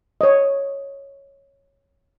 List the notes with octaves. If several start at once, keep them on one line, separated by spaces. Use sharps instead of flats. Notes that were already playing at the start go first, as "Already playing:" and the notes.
C#5 D#5